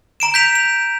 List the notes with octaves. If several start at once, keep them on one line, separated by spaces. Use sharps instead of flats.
A#5 D7 E7
G6 B6 F7
F7